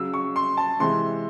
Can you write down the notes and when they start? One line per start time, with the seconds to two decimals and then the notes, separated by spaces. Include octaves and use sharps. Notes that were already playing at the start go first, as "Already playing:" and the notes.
Already playing: C#3 F#3 E6
0.14 C#6
0.36 C6
0.57 A5
0.80 C3 E3 G#3 C6